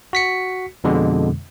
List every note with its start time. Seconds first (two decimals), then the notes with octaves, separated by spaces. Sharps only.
0.13 F#4 B6 C#7
0.84 F2 B2 D3 G#3